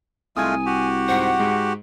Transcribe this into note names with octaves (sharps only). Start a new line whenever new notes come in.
C2 G#3 A3 F4 G#5 D#6 G#6
F#4 G4
G#2 C5 F#5
G#2 G#3